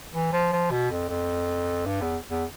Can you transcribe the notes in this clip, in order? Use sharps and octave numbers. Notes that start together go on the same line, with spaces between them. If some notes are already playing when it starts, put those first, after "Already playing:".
E3
F3
F3
B2
F2
F2
G2
E2
E2